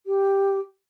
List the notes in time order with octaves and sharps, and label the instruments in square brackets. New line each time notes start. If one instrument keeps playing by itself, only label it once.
[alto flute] G4